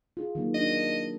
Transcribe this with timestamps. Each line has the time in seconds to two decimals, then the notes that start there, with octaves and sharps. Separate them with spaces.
0.17 F4 G#4
0.35 D#3 F#3 A#3
0.54 D4 D#5